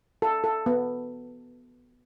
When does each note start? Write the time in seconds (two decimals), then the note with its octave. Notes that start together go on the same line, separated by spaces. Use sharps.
0.22 A4
0.44 A4
0.66 B3